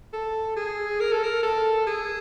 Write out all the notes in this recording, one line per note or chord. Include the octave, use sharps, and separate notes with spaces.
A4
G#4
A#4
A4
A#4
A4
G#4